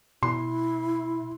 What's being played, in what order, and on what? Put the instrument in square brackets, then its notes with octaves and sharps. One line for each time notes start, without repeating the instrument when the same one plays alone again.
[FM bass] B2 [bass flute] E4 [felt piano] C6